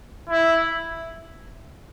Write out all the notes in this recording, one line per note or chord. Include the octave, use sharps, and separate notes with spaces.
E4